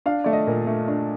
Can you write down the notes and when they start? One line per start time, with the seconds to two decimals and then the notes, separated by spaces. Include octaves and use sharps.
0.06 D4 F5
0.24 A3 D5
0.33 D#5
0.47 A#2
0.67 A3
0.88 D4